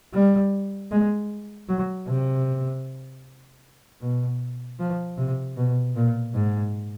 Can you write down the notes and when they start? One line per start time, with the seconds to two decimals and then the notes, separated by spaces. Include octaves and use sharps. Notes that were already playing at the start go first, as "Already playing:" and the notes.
0.14 G3
0.91 G#3
1.69 F#3
2.07 C3
4.01 B2
4.80 F3
5.18 C3
5.57 B2
5.96 A#2
6.35 G#2